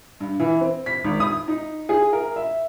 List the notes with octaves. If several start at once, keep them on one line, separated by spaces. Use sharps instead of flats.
G2
E3
C4
B6
G#1
D#6
D#4
G#4
A#4
E5